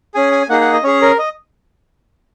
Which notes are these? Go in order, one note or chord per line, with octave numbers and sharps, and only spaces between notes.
C#4 G#4 G#5
G#5
A#3 D#4 G#4 F#5
F#5
D#5
C#4 G#4 C#5
A#4
D#5